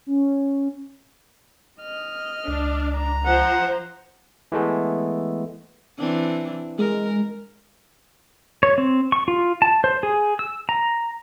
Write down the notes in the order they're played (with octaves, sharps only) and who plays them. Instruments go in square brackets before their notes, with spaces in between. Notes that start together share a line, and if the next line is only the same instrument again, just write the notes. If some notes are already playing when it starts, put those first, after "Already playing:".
[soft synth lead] C#4
[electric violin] D#5 F6
[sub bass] C#2 [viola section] D4
[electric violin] A#5
[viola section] F3 C5 [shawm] F#5
[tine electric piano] E3 G#3 A3 B3
[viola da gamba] E3 C4 D4
[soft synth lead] G#3 [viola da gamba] A#4
[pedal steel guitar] C#5
C4
C#6
F4
A5
C5
G#4
E6
A#5